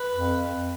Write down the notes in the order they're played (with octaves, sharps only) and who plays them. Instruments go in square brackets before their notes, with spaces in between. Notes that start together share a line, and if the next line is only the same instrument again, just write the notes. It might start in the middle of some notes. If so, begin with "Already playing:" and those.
Already playing: [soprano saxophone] B4
[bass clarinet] F2